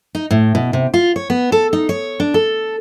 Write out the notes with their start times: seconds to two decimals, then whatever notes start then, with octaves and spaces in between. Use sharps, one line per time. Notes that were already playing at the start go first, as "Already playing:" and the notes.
0.15 D#4
0.31 A2
0.55 B2
0.73 C3
0.94 F4
1.16 C#5
1.30 B3
1.52 A4
1.73 D#4
1.89 C#5
2.20 D4
2.34 A4